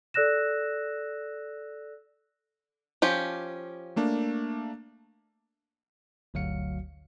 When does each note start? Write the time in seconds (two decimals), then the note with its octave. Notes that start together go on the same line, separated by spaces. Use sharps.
0.14 A4 D5 E6 F#6 A#6 E7
3.02 F3 C#4 G4
3.96 A3 A#3 D4
6.34 G1 D2 F#3 F#4 F5 C#7